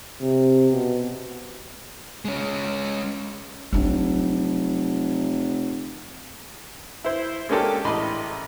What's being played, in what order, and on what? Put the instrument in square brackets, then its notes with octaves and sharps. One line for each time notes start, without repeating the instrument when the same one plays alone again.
[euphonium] C3
B2
[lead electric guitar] G#3 C#4
[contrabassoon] F1 [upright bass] F#3 D4
[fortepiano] E4 C5
G#3 A#3 C#4 D4 G4 A4
A1 D#5 B5 C6